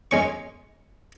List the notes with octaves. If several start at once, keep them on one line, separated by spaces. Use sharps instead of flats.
G#3 C#4 C#6